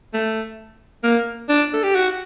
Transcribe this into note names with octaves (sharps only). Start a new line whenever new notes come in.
A3
A#3
D4
A4
G4
F#4